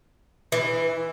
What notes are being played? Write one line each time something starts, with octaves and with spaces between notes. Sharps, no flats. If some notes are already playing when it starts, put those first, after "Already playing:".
E3